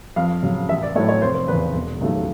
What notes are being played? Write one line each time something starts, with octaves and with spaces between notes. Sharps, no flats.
F2 F5
C#3 F#3
A1 E5
D5
A2 F#3 A3 C#5
C#5
F1 C5
C5
E2 C#3 B4
E1
D#2 C#3 F#3 A3